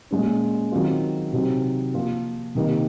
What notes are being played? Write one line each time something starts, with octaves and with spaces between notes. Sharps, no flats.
A#2 G#3 C#4
D#3 F#3 C4 F4
C3 F#3 C4 D#4
F3 A#3 F4
C3 D#3 A#3 D#4